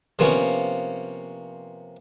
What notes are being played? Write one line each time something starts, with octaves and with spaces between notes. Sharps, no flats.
C3 F3 A#3 B3 C#4